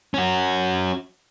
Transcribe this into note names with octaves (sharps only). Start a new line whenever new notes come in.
C#4 F#4